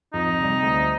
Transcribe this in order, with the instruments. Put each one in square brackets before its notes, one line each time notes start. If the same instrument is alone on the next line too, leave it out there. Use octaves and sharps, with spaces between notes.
[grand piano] F2 [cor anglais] D#4
[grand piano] C3 G3
D2